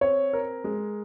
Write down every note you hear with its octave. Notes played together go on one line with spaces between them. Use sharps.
C4 C#5
A#4
G#3